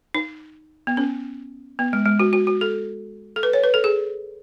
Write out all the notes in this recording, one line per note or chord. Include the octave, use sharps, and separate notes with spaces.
D#4
B3
C#4
B3
G#3
G#3
F#4
F#4
F#4
A4
A4
B4
C#5
B4
A4
G#4